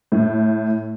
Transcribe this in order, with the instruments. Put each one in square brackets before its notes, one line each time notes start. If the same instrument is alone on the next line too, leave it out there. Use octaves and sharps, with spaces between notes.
[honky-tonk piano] A2